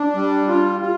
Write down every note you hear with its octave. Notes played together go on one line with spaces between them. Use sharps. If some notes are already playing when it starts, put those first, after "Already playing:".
Already playing: D4
G3
F4
F4